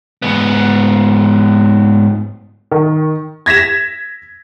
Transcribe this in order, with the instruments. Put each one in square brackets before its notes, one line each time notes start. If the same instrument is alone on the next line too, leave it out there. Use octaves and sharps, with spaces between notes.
[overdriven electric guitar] G#2 B3
[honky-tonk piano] D#3
G#6 A#6 B6 E7